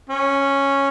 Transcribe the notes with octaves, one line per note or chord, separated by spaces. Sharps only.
C#4